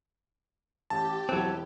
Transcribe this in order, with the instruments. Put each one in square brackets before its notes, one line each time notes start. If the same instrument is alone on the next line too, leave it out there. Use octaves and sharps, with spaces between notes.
[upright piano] A1 [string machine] G4 [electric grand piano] A5
[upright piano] E1 E4 F#6 [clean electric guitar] F#3 C4